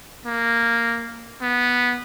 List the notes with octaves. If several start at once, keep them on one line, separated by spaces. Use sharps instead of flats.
A#3
B3